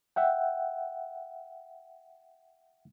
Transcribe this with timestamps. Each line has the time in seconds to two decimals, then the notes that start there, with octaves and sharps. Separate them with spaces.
0.16 E5 F#5 G5